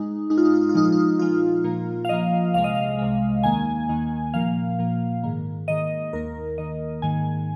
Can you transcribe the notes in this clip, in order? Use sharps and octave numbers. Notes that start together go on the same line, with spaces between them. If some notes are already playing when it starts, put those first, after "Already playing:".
Already playing: G#2 G#3 D#4
G#2 G#3 D#4
F4
D#4
F4
D#4
F4
A#2 F3 G#3 D#4
F4
D#4
F4
D#4
A#2 F3 G#3 F4
A#2 F3 A#3
F5
A#2 F3 A#3 D#5
C2 C3 G#3 F5
D#5
F5
C2 C3 G#3
D#2 D#3 A#3 G#5
D#2 D#3 A#3
A#2 F3 A#3 F5
A#2 F3 A#3
G#2 D#3 A#3
G#2 D#3 A#3 D#5
D#2 D#3 A#3 A#4
D#2 D#3 A#3 D#5
G#2 D#3 A#3 G#5